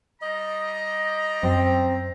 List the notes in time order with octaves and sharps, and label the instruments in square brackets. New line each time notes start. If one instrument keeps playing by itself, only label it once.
[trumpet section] G3 A#5 [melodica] D#5
[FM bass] F#2 [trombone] C4